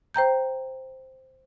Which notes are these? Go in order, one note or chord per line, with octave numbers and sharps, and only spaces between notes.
C5 G5 A#5 G6